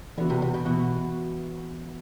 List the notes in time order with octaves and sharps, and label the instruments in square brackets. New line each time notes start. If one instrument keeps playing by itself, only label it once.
[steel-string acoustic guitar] D3 [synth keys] E3 B3 F#4
[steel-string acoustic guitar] C3
C3
B2
[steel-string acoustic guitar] B2 [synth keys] E3 B3 F#4